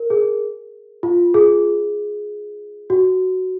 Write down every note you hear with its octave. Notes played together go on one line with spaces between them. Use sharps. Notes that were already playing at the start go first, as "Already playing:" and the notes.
Already playing: A#4
G#4
F4
G#4
F#4